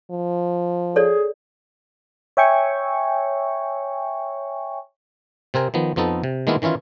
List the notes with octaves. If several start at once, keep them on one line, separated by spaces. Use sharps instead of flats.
F3
G#4 A4 C#5 D5
C#5 E5 G5 G#5 C#6
C3 C4 A#4 G#5
D#3 F3 B3
F2 F3 B3 D#4 A4
C3
D#3 G#3 A#3 B3 E4 F4
D#3 E3 C#4 E4 F4